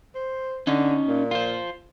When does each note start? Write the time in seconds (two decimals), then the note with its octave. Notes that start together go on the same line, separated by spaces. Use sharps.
0.15 C5
0.67 D3 C#4 D#4
1.08 A#2
1.31 F4 C5